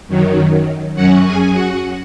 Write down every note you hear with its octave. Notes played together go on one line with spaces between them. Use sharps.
F#2 D#3 F#3
F#2 F#3 C#4 F#4 F#5
G#4 G#5
F#4 F#5